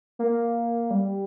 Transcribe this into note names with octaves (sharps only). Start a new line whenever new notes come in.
A#3
G3